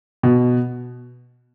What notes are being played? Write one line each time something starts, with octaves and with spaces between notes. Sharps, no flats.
B2